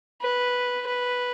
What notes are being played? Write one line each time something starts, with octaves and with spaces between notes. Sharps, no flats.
B4
B4